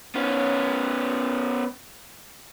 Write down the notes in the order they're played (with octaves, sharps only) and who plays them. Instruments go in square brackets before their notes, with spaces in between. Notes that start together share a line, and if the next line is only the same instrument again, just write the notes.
[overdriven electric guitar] B3 C#4